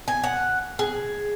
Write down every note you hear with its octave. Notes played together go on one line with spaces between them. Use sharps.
G#5
F#5
G#4